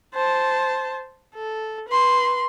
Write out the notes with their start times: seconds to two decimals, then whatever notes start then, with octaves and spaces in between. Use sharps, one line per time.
0.14 C5 A5
1.35 A4
1.88 B4 C6